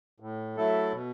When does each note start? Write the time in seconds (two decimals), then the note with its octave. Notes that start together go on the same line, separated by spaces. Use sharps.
0.20 A2
0.57 F#3 A3 E4 A4
0.93 B2